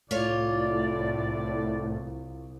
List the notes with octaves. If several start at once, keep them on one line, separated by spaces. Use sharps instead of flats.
C2 A2 F4 C#5 D5